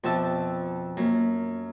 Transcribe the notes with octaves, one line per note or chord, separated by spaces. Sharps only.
F2 B2 G4 E5 A5
F#2 A#3